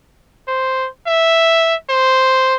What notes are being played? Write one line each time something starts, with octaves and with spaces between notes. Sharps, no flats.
C5
E5
C5